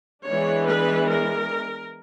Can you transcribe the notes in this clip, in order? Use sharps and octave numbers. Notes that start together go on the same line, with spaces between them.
E3 G#3 B3 D4 C#5
B4
A#4